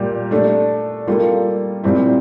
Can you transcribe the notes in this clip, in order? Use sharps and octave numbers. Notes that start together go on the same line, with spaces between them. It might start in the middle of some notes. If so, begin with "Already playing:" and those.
Already playing: A#2 G3 A#3 G4
A3 D4 A4
G3 A#3 F4 A4
A#2 G3 C4 E4